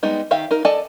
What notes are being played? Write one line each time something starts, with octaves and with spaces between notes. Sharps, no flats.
G3 G#3 B3 D#4
D#3 G4 E5 F5
D#4 A#4
A4 D5 D#5 G#5 A5